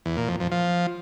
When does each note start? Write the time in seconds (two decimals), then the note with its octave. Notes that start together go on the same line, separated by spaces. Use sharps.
0.06 E2
0.17 A#2
0.29 F2
0.40 F2
0.51 F3